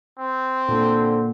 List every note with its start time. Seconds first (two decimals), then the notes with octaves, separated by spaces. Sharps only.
0.19 C4
0.68 A#2 D3 A#3